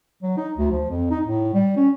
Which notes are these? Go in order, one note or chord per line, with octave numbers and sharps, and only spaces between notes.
F#3
D#4
D2
F3
F2
D#4
A2
G3
C#4